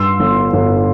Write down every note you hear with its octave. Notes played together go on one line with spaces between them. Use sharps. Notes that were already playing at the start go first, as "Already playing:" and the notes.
Already playing: G2 C6 E6
G1
G1